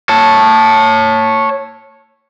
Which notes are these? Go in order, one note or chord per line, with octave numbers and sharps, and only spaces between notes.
C#5 A5